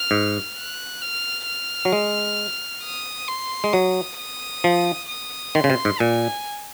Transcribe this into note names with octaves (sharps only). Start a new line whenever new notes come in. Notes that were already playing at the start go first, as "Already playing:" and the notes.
Already playing: F6
G#2
F#6
F6
F6
F#3
G#3
D#6
C6
G#3
F#3 D#6
D#6
F3
D#6
D#3 C6
C#3
C3
G#2
A#2 G#5